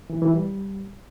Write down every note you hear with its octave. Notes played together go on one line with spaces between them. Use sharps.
E3
E3
G3